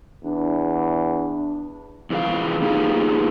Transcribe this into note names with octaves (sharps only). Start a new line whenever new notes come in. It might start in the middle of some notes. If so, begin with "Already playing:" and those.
E2 D4
E2 E3 F3 G#4 F5
A#3 D#4 F4 G4 G#4